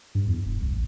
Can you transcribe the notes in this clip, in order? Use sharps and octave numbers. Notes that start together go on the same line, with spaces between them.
G2
E2
E1
C2
A1